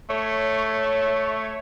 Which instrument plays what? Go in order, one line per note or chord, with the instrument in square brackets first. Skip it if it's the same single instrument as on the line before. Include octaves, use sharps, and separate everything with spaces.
[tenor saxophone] A3 [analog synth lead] C#5